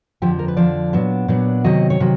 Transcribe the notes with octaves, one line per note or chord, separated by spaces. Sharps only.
F2 D3 F3 G4
A#4
B4
F2 D3 F3 D5
A#2 F#3 B3 D4
A#2 F#3 B3 D4
C3 D#3 F#3 D#5
C#5
C3 D#3 F#3